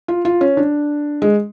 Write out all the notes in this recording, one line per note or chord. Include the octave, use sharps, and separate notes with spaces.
F4
F4
C#4
D4
G#3